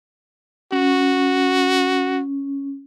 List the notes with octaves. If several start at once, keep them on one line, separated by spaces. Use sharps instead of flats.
C#4 F#4